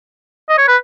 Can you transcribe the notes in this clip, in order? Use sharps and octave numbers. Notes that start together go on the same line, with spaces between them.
D#5
C#5
B4